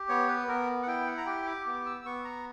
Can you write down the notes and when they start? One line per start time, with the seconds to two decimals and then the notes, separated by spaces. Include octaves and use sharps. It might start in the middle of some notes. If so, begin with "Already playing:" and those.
Already playing: G4
0.09 B3 C#5
0.28 B4
0.48 B3 A#4
0.83 F#5
0.87 E4 G5
1.07 F#5
1.17 A#5
1.26 G4 G5
1.46 D6
1.66 B3 D6
1.86 E6
2.05 B3 C#6
2.25 A#5